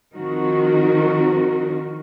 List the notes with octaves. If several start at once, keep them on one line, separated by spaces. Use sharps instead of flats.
D#3 F3 C4 D#4 F#4 A#4